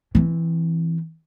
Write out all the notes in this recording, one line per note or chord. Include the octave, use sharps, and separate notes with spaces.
E3 C4